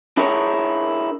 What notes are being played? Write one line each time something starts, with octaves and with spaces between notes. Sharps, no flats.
D4 E4 G#4 A#4 C#5